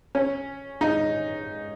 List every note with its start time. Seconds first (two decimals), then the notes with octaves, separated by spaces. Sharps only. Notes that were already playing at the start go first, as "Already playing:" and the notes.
0.15 C#4
0.81 D#4